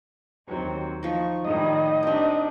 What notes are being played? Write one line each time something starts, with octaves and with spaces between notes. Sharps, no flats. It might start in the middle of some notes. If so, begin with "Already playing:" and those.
D#2 F#3 C4
F3 D#4 C#6
A2 D#3 G3 D#5
C4 D4 D#4 G4